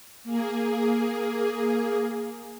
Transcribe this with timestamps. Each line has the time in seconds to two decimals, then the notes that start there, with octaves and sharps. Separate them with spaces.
0.23 A#3 G#4